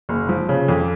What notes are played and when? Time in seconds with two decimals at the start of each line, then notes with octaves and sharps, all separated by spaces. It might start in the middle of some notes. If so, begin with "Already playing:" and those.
0.09 F#1
0.29 F3
0.49 C#3
0.68 F2